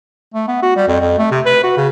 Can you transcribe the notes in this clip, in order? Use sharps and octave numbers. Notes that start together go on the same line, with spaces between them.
A3
B3
F#4
G3
F2
F2
A3
C3
B4
F#4
C#3